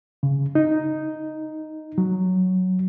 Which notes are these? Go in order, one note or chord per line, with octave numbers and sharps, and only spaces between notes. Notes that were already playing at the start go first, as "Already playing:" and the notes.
C#3
D#4
F#3